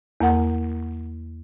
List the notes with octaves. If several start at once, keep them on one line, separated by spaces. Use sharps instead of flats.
E2 A#3 A#4 F#5